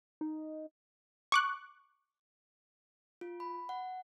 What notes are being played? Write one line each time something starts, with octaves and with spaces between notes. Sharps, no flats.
D#4
C#6 D6 F#6
F4
B5
F#5